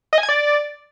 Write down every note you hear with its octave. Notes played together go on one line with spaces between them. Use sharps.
D#5
G#5
G#6
D5